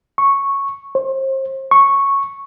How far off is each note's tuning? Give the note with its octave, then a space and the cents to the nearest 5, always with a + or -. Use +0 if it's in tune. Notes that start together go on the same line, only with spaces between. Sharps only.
C#6 -5
C5 +35
C#6 -5